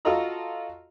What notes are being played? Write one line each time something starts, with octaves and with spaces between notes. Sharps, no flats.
F4 F#4 A4 D#5 A#5 E6